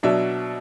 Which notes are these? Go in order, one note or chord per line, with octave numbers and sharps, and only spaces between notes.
B2 F#3 D4 E5